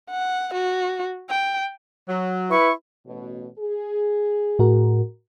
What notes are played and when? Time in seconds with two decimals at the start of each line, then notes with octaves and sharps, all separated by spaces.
0.11 F#5
0.54 F#4
1.30 G5
2.09 F#3
2.51 E4 B4 C#6
3.06 A1 B2
3.58 G#4
4.59 A2 F#4 A#4